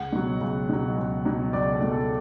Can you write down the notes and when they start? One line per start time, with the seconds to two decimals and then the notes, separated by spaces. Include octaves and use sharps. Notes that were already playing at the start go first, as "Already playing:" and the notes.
Already playing: C#2 F#5
0.13 B2 F#3
0.41 C#2
0.69 B2 F#3
0.98 C#2
1.25 B2 F#3
1.53 C#2 D5
1.72 A4
1.81 B2 F#3
1.91 A4